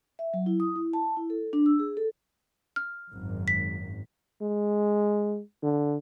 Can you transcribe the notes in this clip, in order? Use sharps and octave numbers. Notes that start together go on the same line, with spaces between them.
E5
F#3
E4
D#6
E4
A5
E4
A4
D4
E6
G#4
A4
F6
G#1 F#2
B6
G#3
D3